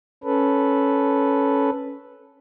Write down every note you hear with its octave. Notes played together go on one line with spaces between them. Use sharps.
C#4 A4 B4